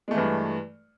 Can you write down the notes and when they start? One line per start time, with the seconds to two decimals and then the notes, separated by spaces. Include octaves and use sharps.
0.08 G#3
0.11 A3
0.14 E3
0.18 G2